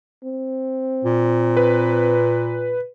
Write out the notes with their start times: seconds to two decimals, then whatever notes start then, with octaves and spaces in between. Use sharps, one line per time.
0.24 C4
1.05 A#2
1.57 B4